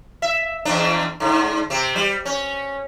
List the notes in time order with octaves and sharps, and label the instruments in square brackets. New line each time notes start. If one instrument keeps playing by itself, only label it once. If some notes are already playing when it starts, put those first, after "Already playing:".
[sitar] E5
E2 C4 D4
G#2 D3
C3 C4
G3
C#4